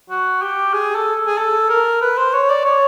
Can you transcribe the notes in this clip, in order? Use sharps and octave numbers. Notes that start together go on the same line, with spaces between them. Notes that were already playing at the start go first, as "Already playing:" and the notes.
F#4
G4
G#4
A4
G#4
A4
A#4
B4
C5
C#5
D5
C#5